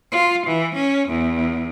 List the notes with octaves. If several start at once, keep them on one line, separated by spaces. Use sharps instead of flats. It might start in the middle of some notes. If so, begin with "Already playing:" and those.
F4
E3
C#4
E2